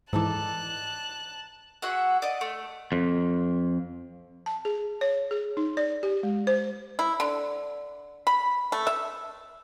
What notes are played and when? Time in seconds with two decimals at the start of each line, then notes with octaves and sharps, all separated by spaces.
0.13 G#2 E3 D#4 A4 D5 A5 F#6
1.82 F#4 G#4 E5 F#5
2.22 D5 D#5
2.41 A3
2.92 F2
4.46 A5
4.65 G#4
5.01 C#5
5.31 G#4
5.57 D#4
5.77 D5
6.03 G4
6.23 G#3
6.47 C5
6.99 E4
7.20 D3
8.27 B5
8.72 A3
8.87 E5